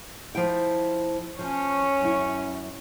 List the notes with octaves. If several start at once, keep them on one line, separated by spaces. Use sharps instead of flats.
F3 E4 G5
F3 C#4 C#5
F#2 E4